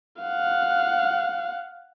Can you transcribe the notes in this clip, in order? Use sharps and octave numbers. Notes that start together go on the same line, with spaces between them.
F5 F#5